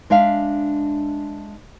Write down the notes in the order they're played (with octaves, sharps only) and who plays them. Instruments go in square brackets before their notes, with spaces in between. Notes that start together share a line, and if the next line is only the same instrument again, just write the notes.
[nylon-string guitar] G#3 D4 E5 F5